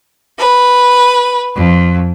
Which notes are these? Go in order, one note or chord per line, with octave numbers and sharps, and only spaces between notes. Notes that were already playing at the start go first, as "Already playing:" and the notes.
B4
F2